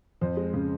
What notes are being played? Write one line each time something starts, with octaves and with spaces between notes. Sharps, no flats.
F2 C5
G#3
C#3